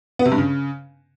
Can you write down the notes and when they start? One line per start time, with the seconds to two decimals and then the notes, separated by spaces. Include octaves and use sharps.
0.19 B3
0.26 C3
0.32 G2
0.38 C#3